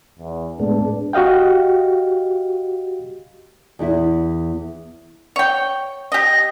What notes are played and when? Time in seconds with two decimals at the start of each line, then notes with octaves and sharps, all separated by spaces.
0.19 E2
0.59 A2 G#3 B3 D4
1.13 F#4 G4 D#5 F5 G5
3.79 E2 B3 E4
5.36 C#5 G5
6.12 G4 D#5 A#6